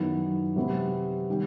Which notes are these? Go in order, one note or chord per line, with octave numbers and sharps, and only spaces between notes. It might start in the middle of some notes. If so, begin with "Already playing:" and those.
Already playing: F#2 D#3 F#3 B3 E4
C3 F#3 B3 F#4
D#3 G3